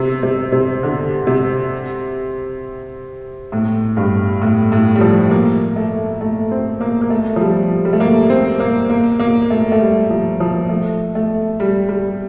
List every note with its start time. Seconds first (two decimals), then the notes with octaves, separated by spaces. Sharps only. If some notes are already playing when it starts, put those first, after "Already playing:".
Already playing: C3
0.23 C3
0.52 C3
0.83 D3
1.27 C3
3.52 A2
3.97 G2
4.42 A2
4.72 A2
4.95 G3
5.01 F3
5.31 A#3
5.76 A3
6.21 A3
6.51 C4
6.81 A#3
7.01 A#3
7.10 A3
7.36 F3
7.41 G3
7.85 G3
7.93 A3
8.00 A#3
8.30 C4
8.60 A#3
8.90 A#3
9.19 A#3
9.50 A3
9.72 A3
9.81 G3
10.10 F3
10.40 F3
10.69 A3
11.15 A3
11.60 G3
11.89 G3